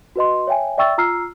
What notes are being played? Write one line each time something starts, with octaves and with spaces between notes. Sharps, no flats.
F#4 B4 D#5 C6
C#5 E5 G5 G#5
D5 E5 G5 C#6 E6 A6
F4 A#5 E6 F6 C7